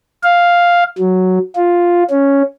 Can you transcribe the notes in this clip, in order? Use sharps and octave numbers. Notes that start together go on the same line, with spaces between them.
F5
F#3
F4
C#4